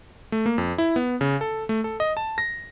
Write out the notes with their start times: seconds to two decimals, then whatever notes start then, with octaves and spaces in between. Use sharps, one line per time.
0.32 A3
0.46 A#3
0.58 F2
0.78 E4
0.96 B3
1.21 C#3
1.41 A4
1.69 A3
1.84 A4
2.00 D#5
2.17 A5
2.38 A#6